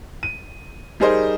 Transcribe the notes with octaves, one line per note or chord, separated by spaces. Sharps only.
D#7
G3 D#4 G#4 A#4 C5 D#5